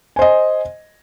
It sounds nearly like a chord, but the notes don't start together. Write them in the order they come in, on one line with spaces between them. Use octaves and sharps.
G#5 C5 D#5